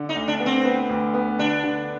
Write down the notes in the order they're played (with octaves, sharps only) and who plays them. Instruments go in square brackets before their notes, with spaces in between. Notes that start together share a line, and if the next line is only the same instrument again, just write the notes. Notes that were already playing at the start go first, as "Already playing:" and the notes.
Already playing: [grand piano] D3
[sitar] D#4
[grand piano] D2
[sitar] D4
[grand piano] B3
[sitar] C4
[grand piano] B3
D2
B3
[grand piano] D3 [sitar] D4
[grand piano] D3